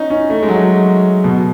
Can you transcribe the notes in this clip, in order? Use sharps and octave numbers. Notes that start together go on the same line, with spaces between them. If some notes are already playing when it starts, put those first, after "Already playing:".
Already playing: C#4 D#4
C#4
A3
G#3
F#3
B2